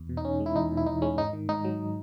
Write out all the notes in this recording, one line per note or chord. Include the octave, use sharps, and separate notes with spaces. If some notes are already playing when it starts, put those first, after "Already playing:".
Already playing: E2
B2
D#4
E2 C#4
G#3
E4
E2 D#4
B2
E4
E2 D#4
G#3 C#4
G#2 D#4
D#3
G#2 D#4
F#3